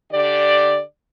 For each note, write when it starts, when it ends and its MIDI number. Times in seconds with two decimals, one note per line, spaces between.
0.12 0.79 50
0.12 0.79 67
0.12 0.79 74